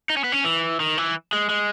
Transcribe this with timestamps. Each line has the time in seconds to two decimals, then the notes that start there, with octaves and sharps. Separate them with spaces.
0.10 D#4
0.17 C#4
0.24 B3
0.32 C#4
0.45 E3
0.80 D#3
0.98 E3
1.33 G#3
1.50 G#3